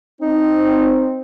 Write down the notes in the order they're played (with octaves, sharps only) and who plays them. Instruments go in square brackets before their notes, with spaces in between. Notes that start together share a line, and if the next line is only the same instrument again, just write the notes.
[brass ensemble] C4 [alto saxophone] D#4